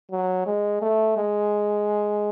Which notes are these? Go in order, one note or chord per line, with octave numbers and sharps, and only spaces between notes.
F#3
G#3
A3
G#3